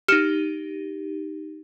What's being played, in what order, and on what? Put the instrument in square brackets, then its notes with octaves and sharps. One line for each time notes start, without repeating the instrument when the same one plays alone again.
[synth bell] D#4 G4 [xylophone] F6 C#7 E7